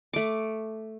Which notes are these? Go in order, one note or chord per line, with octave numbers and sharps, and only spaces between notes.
A3 D6